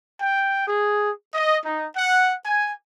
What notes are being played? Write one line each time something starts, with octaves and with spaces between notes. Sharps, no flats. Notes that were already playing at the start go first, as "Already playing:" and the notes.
G5
G#4
D#5
D#4
F#5
G#5